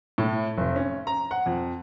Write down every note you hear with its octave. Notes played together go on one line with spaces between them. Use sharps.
A2
F1
C#4
A#5
F#5
F2